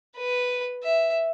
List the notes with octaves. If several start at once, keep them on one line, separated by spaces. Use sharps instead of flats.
B4
E5